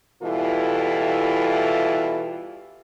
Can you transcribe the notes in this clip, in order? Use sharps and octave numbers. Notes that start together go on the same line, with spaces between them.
B2 E3 G3 E4 F4 A4